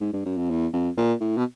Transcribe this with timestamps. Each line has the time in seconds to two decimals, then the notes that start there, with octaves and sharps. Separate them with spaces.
0.01 G#2
0.13 G2
0.26 F#2
0.38 F2
0.50 E2
0.73 F2
0.97 A#2
1.21 A2
1.38 B2